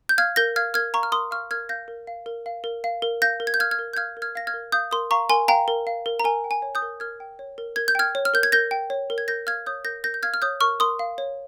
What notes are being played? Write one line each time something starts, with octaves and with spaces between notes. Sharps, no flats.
G6
F5 F6 G#6
A#4 G6 A#6
F5 F6 G#6
A#4 F6 G#6
F5 A#5 C#6
F6
A#4 C6 D#6
F5 C#6 F6
A#4 F6 G#6
F5 G6 A#6
A#4
F5
A#4
F5
A#4
F5
A#4
F5 G6 A#6
A#4
G#6
G6
F5 F6 G#6
F6 G#6
A#4
G6
F5 F6 G#6
A#4
F6 G#6
F5 A#6
F6 G#6
A#4
F5 D#6 G6
A#4 C6 D#6
F5 A#5 C#6
A#4 G#5 C6
F5 G5 A#5
A#4
F5
A#4
A#5
A#4 G#5
G5
G#5
C#5
D#6 G6
A#4
A#4 F6 G#6
G5
C#5
A#4
A#4 G#6
G6
G5 F6 G#6
C#5
F6
A#4 G6
G#6
A#4 G6 A#6
G5
C#5
A#4
G#6
A#4 G6 A#6
F5 F6 G#6
C#5 D#6 G6
A#4 G6 A#6
A#4 G6 A#6
G6
F5 F6 G#6
F6
C#5 D#6 G6
A#4 C#6 F6
A#4 C6 D#6
F5
C#5